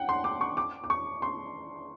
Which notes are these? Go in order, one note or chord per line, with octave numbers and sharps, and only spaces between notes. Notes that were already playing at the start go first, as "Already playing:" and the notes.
Already playing: F#5 G5
C6
D6
C#6
D6
D6
C#6
C6